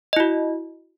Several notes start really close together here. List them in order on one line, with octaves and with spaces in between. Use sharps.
D#5 E4 F#4